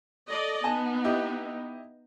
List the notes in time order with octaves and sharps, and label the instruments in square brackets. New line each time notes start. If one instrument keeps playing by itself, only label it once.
[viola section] A4 D5 D#5
[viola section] B3 D#4 [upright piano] G#5 A5
[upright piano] E4 G4 D#5